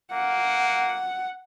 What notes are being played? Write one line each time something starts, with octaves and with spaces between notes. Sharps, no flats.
A#3 F#5